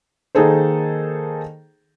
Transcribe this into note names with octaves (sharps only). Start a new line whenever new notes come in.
D#3 A#3 D#4 G#4 A4 C5